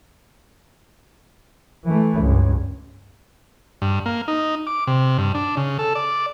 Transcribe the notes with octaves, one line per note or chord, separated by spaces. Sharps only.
E3 A3
C#2 G2
G2
A#3
D#4
D6
C3
G2
D4
C#3
A4
D5